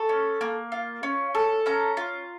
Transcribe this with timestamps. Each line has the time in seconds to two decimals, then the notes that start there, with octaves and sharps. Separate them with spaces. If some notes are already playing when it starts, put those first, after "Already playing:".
Already playing: A4 C#6
0.09 C#4
0.41 A#3
0.72 F4
1.03 C#4
1.35 A4
1.66 C#4 A#5
1.97 F4